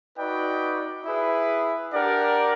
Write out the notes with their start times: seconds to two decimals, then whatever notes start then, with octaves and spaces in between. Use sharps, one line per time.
0.17 D#4 F#4 B4 D5 G5
1.05 E4 G#4 B4
1.93 D4 G4 A#4 D5 F#5